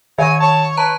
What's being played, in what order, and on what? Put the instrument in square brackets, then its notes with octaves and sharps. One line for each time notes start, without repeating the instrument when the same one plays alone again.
[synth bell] D#3 [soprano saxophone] C#5 [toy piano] E5 C#6 [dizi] G#5
[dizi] C#5 [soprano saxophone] A5
[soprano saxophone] B4 [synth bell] A5 A#5